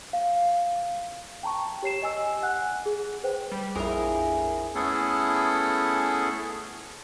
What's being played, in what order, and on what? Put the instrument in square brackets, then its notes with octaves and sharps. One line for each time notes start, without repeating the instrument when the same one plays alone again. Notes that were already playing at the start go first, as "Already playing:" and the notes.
[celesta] F5
G5 A5 A#5 C#6
G4 C#5 C7 E7
D#5 G#5 E6
F#5 G#5 F#6
G#4
B4 C5 G5
[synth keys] G3
[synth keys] A#1 F2 A#4 [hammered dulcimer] E4 G#4
[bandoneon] A3 B3 C#4 E4 G#4 A4